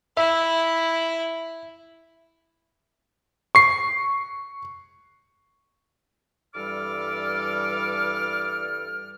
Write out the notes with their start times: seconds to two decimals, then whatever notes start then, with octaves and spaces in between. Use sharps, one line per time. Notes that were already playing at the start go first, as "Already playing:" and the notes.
0.17 E4 E5
3.55 C#6 C7
6.55 G2 E3 G3 A4 D6 F6